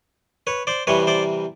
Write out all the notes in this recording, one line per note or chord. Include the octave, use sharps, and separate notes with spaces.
B4 C#5
C5 D5
C3 E3 G3 B4 C#5
C5 D5